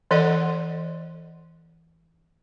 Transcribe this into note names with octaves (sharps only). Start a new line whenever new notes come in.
E3 A4 D5 D#5 F#5